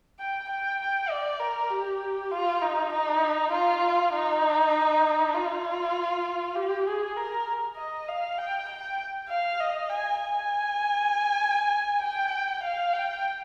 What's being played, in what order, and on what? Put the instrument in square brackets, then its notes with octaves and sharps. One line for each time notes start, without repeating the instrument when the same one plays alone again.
[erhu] G5
G5
G5
D5
A#4
G4
F4
D#4
D#4
F4
D#4
F4
G4
G#4
A#4
D#5
F5
G5
G5
F5
D#5
G#5
G#5
G5
F5
G5